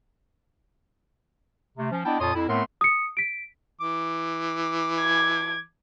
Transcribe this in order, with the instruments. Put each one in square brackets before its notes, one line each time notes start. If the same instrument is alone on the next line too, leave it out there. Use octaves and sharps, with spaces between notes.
[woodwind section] C3 A3
F3 C#4
B3 D4 E4 D#5 G5 A5
F2 A#2 C#5 A5 C6 D#6
F2 E4
A2 A3 B3 C4 A#4 C6
[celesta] D#6 C#7
B6 D7
[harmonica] E3 D6
[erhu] G#6